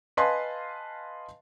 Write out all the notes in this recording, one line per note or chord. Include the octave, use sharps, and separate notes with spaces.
B4 D#5 F5 G#5 A5 C6